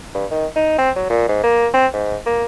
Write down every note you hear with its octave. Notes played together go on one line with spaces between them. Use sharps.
G2
D#3
D#4
C4
F#3
A#2
G#2
A#3
C4
G#2
A#3